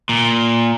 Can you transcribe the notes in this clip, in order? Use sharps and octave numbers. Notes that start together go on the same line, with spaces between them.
A#2